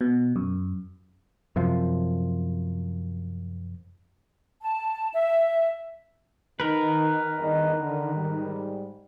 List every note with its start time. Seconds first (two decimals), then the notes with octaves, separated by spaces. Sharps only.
0.01 B2
0.36 F#2
1.56 F#2 C3 F3
4.61 A5
5.14 E5
6.60 D#3 D#4 A#4 B4
7.38 E2 G2 D#5
7.79 D3
8.14 G#2 G3